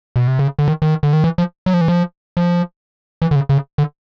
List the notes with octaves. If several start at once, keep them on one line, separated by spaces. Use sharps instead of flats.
B2
C3
C#3
D3
D#3
D#3
D3
D#3
E3
F3
F#3
F3
E3
F3
F3
E3
D3
C#3
C#3
D3